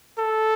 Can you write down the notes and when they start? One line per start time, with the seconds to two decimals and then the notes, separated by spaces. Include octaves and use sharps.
0.18 A4